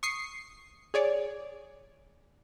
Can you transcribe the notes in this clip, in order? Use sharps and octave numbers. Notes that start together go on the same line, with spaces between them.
C#6 D#6 C7 C#7
G#4 C#5 D5